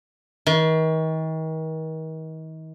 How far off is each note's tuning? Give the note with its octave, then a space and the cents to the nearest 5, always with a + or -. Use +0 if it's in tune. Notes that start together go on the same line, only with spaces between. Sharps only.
D#3 +40